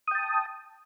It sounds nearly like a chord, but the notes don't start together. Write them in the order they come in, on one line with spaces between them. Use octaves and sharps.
D#6 G5 A5